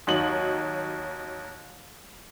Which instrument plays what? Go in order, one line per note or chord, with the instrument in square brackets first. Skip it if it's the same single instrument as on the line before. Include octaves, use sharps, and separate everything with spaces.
[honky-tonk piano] D#2 F#3 D#4 F#7